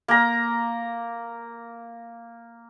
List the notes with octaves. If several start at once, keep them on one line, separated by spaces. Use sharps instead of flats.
A#3 A#5